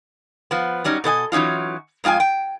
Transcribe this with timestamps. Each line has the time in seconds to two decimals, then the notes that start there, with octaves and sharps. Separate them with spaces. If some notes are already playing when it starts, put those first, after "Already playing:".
0.51 F3 B3
0.84 F#3 G3 C#4 D#4
1.04 B2 A4 D#5 G#5
1.32 E3 F#3 C#4 D#4 F4
2.04 F2 G#3 F4 G5 G#5
2.20 G5